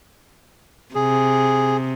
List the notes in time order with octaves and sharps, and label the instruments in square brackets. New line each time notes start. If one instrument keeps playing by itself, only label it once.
[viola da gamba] C3 [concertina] G#4